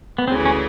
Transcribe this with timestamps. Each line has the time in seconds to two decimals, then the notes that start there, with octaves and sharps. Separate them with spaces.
0.18 B3
0.28 D2 C#3 E3 C4
0.45 C#4